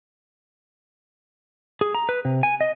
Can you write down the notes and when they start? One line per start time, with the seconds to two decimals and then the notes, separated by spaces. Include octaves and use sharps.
1.81 G#4
1.95 A#5
2.09 B4
2.25 C3
2.43 G#5
2.61 D#5